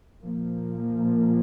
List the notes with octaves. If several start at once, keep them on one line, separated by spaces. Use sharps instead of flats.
A#2 F3 A#3